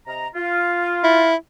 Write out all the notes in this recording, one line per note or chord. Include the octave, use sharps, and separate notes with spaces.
C3 D#5 A#5
F4
E4